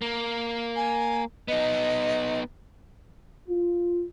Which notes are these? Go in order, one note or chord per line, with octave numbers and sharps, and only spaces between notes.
A#3
G#5
B3 D#4 D#5
F4